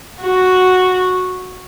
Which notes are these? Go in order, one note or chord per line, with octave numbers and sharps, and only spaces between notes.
F#4